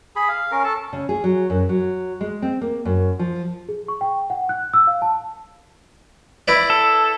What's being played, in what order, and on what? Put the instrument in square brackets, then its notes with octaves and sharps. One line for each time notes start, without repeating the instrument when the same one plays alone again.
[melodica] G#4 B5
F5
C#4 A#4
A4 A5
[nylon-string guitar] C#3
G#4
F#3
F#2
F#3
G#3
C4
A#3
F#2
F3
[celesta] G#4
C#6
G5
F#5
F#6
E6
F5
A5
[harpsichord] E4 B4 D5
[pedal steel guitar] A4